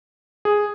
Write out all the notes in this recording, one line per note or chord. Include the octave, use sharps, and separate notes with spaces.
G#4